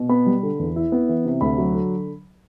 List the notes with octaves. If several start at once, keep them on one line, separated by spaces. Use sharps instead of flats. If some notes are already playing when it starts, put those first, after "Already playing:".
Already playing: B2
B3 B5
G3
D3
E2
E4
B3
E3
C3
D2 B5
F#3
D3